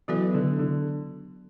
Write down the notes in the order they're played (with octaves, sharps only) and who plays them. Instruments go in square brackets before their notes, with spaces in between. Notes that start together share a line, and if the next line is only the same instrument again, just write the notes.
[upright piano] E3 [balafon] F#3 B3 F#4 A4 D5
[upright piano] D3
D3